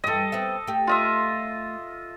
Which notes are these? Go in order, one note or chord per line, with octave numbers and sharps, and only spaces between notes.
G2 E3 A4 D#5
B3 C4 E5
A3 G4
F4 D#5 E5